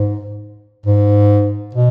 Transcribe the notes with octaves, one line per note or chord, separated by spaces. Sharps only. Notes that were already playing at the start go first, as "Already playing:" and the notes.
Already playing: G#2
G#2
B2